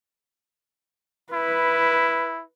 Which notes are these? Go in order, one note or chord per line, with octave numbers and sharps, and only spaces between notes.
E4 B4